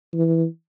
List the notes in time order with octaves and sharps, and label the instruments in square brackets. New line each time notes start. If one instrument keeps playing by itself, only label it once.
[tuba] E3